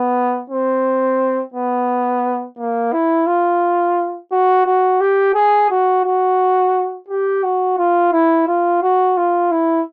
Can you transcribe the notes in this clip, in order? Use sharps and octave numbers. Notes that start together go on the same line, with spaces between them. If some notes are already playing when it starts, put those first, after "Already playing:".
Already playing: B3
C4
B3
A#3
E4
F4
F#4
F#4
G4
G#4
F#4
F#4
G4
F#4
F4
E4
F4
F#4
F4
E4